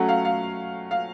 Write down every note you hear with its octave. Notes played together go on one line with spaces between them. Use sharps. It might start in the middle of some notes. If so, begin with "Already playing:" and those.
Already playing: F#3 A3 C#4 F#5
F5
F5
F5